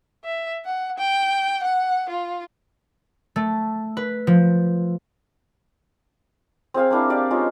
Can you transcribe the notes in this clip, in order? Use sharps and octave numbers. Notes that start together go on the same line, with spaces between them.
E5
F#5
G5
F#5
F4
A3
B4
F3
C4 G#4 F5 G#5
A#3 C4 D4 E4
G4 D5 F5
G#3 C#4 D#4 F4